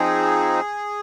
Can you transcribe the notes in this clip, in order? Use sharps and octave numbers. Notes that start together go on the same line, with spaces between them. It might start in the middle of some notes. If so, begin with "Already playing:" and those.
Already playing: F3 C4 D#4 G#4